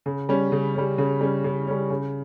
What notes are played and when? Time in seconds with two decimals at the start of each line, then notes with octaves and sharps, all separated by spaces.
0.06 C#3
0.29 G3 C#4
0.52 C#3
0.75 G3 C#4
0.98 C#3
1.21 G3 C#4
1.44 C#3
1.67 G3 C#4
1.90 C#3